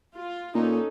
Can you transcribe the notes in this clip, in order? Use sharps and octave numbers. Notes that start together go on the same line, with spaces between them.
F4
A#2 C#4 D#4 A4